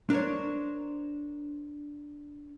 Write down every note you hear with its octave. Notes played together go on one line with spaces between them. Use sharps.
D4 A#4 C5 C#5